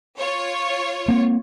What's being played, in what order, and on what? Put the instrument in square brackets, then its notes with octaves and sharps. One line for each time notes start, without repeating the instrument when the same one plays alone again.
[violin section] F4 C#5
[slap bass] A#3 C4